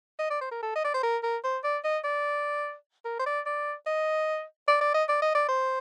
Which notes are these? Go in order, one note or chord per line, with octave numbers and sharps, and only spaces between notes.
D#5
D5
C5
A#4
A4
D#5
D5
C5
A#4
A#4
C5
D5
D#5
D5
A#4
C5
D5
D5
D#5
D5
D5
D#5
D5
D#5
D5
C5